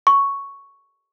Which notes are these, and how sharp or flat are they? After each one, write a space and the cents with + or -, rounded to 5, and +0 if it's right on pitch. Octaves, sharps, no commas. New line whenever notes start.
C#6 +0